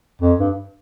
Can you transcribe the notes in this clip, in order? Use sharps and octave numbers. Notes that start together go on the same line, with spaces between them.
F2
G2